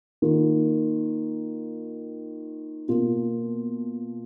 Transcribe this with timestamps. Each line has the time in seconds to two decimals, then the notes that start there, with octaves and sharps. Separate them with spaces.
0.22 D#3 A#3 F4
2.88 B2 A#3 F4